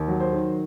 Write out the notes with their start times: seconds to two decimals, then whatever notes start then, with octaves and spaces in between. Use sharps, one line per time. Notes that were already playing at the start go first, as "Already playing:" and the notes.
Already playing: D#2
0.08 F#3
0.20 C5
0.33 D#3